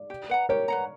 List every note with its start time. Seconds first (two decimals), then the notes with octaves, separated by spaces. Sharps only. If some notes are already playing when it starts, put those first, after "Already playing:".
Already playing: D5
0.10 G4
0.29 B4 F#5 A#5
0.49 G4 A#4 C#5
0.68 B4 F#5 A#5